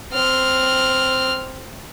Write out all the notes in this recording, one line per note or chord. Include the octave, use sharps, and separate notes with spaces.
C4 F6